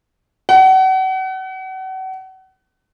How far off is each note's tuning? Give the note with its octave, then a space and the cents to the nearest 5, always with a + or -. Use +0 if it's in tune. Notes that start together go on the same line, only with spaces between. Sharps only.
F#5 +35